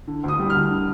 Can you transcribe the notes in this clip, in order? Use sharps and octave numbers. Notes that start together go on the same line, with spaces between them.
D3
D2 D#6
G3
F6
D2
D3